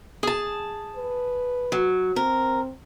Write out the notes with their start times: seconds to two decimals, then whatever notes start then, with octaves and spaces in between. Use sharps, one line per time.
0.23 G#4 A5
0.96 B4
1.72 F#3
2.16 C4 A#4